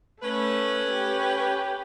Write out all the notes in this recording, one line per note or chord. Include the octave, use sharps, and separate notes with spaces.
A3 C#4 B4
G4